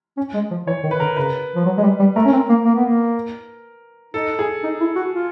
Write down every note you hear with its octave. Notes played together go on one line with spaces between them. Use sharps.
C#4
G#3
F3
E3 C#5
D#3
B4
D3 A#4
C#3 B4
F3
F#3
G#3
G3
G3
A3 A#4
C#4
C4
A#3
A#3
B3
A#3
D#4 A4
G#4
D#4
E4
F#4
F4